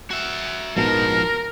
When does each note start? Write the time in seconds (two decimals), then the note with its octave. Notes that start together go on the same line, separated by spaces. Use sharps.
0.11 F#4 E5
0.76 A#1 G#2 B2 F3 A#4